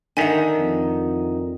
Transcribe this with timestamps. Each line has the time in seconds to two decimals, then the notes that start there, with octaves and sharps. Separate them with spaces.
0.17 D3 D#3 D#4 E5 G#5 B6
0.59 F2